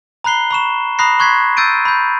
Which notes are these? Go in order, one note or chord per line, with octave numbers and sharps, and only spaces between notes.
A#5 B5 F#6 C7 G7
B5 C#6 E7
A#5 B5 D#6 F#6 A#6 C7
C6 C#6 F#6 G#6 B6 C7
E6 G6 A6 D7 D#7
B5 G6